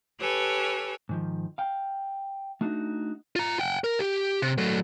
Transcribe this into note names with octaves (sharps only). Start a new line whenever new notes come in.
G4 A4 B4 C#5 G#5
G#2 D#3 F3
F5 G5
A3 D4 D#4 F#4
F4 A#5
F#5 G5
A#4
G4
C3
F#3 A3